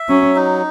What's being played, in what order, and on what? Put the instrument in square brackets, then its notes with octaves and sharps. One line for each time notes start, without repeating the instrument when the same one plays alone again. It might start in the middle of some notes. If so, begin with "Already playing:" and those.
Already playing: [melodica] E5
[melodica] F#3 [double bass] C#4
[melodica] D#4